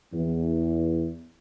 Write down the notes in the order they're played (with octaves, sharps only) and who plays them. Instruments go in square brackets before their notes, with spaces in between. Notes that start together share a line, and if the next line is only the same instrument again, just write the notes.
[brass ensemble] E2